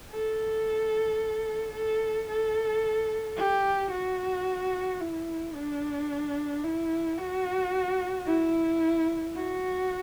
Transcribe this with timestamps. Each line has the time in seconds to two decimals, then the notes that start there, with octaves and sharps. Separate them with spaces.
0.11 A4
1.73 A4
2.29 A4
3.37 G4
3.91 F#4
5.00 E4
5.54 D4
6.63 E4
7.17 F#4
8.26 E4
9.35 F#4